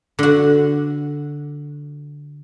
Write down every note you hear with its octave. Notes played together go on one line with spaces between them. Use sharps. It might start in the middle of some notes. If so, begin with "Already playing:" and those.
D3 F#4